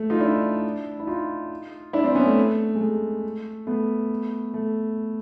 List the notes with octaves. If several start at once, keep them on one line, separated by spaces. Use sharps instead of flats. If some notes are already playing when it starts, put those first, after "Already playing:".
Already playing: A3
D#4 F4
D4 E4
E4
D#4 F4
D4 E4
C4 D4
B3 C#4
A3
G#3
A3
A3 B3
A3